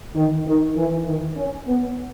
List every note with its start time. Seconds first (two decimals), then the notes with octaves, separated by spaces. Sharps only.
0.16 D#3
0.46 D#3
0.76 E3
1.07 D#3
1.37 C#4
1.67 B3